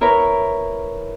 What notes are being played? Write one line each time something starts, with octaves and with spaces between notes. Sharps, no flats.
E4 A#4 B4 C#5